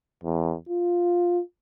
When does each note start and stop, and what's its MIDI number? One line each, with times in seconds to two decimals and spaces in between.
0.24 0.55 40
0.69 1.41 65